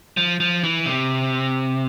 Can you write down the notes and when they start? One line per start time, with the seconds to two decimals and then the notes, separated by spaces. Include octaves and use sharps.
0.17 F3
0.40 F3
0.64 E3
0.86 C3